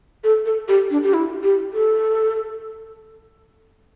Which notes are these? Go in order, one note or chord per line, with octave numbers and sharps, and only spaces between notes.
A4
A4
G4
D4
G4
E4
G4
A4